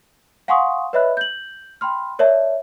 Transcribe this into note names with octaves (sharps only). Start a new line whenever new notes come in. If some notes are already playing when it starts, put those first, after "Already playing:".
F5 F#5 G#5 C6 C#6 D#6
B4 C#5 D#5 E5 B5 F#6
G6 F#7
G5 B5 C6 F6
A#4 C#5 D5 E5 A5